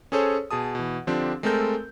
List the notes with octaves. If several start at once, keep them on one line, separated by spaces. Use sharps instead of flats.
C#4 G#4 A4 C5 C#5
B2 G#4 A5 D#6
B2 E3
D3 F3 C4 D4 G4
G#3 A3 C4 A4 A#4 G6